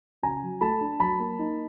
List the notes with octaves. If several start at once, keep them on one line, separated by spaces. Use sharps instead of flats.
C#3 G#5 A#5
F#3
A3 A5 B5
D4
F#3 A5 B5
A#3
D#4